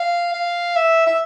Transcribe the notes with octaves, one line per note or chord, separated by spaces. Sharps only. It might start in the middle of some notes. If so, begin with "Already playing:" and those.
Already playing: F5
F5
E5
E5